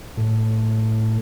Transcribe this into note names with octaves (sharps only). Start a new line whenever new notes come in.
A2